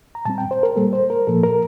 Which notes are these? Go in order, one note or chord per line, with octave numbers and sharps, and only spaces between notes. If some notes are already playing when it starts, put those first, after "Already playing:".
A#5
A#2 G3 C4 A5
G5
C5
A#4
A#2 G3 A#3 A4
C5
A#4
A#2 F3 A#3 A4
A#4